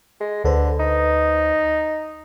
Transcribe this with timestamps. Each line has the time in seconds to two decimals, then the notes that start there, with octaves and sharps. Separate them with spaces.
0.20 G#3
0.44 D2 D3 B4 C5
0.79 D#4